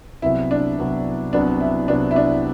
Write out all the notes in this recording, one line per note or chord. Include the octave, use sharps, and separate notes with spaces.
C2 C3 F#3 B3 E4
D4
C2 C3 F#3 B3
C2 C3 F#3 B3 D4
E4
C2 C3 F#3 B3 D4
E4
D4